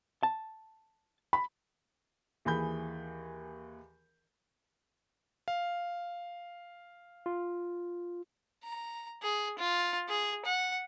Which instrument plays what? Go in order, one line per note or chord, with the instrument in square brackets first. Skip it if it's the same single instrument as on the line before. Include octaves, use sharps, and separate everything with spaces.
[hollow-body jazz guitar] A5
[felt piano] B5
D#2 E3 G#4 B5 G6
[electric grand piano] F5
[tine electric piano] F4
[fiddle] A#5
G#4
F4
G#4
F#5